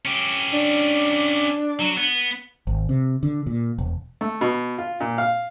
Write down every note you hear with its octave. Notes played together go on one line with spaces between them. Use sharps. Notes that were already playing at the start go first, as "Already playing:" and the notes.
C#4 G4
D4
F#3
B3
G#1
C3
D3
A#2
E1
A3
B2
F4
A#2
F5